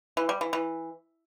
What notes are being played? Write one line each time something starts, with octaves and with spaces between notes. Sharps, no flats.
E3
G3
E3
E3